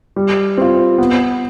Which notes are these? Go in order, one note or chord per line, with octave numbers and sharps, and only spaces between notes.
G3
C4 F4
B3